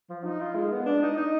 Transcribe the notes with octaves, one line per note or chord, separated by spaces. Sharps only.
F3
D#4
F4
G#3
B3
D4
D#4
D#4